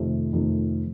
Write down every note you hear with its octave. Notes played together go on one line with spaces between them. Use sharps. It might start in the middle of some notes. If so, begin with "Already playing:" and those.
Already playing: F2 C3 D#3 A3
F2 C3 D#3 A3